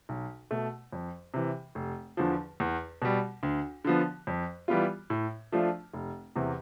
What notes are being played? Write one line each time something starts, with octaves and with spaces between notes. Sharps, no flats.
B1
B2 A3
F2
C3 E3
F1
E2 D3 F3
E2
B2 G3
D2
D3 F3 B3
F2
E3 G3 B3 F4
A2
F3 A3 D4 F4
F1
E2 C3 E3